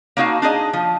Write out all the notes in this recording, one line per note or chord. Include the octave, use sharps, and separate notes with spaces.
A#3 D4 D#4 F#4 F5 A5
D4 D#4 G#4 D#5
F3